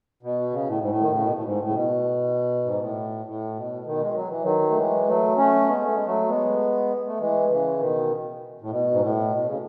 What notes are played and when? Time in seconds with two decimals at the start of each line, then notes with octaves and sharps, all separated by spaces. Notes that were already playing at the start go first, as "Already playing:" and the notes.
0.23 B2
0.52 C#3
0.68 A2
0.79 G#2
0.89 A2
1.01 D#3
1.12 C#3
1.22 B2
1.33 A2
1.44 G#2
1.59 A2
1.69 C#3
1.73 B2
2.64 G#2
2.79 A2
3.26 A2
3.56 B2
3.86 B2 D#3
4.01 G#3
4.14 F#3
4.29 E3
4.42 D#3 F#3
4.70 A3
4.76 E3 G#3
5.07 F#3 A3
5.37 A3 C#4
5.68 G#3 B3
5.83 A3
5.94 G#3
6.05 F#3 A3
6.29 G#3 B3
7.07 A3
7.20 E3 G#3
7.49 C#3 E3
7.80 B2 D#3
8.61 A2
8.71 B2
8.91 G#2
9.01 A2
9.31 B2
9.47 C#3